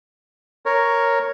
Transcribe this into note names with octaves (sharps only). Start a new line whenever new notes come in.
A#4 C#5